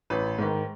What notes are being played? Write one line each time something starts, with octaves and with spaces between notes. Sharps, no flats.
A1 B4
G#2 D#3